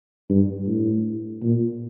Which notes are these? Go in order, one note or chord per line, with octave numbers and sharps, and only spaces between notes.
G2
A2
A#2